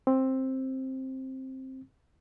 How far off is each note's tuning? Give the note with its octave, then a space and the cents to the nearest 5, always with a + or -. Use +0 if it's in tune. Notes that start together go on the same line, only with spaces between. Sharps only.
C4 +10